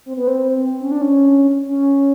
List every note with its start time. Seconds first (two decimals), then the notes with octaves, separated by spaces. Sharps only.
0.06 C4
0.17 B3
0.27 C4
0.81 C#4
0.92 D4
1.02 C#4
1.67 C#4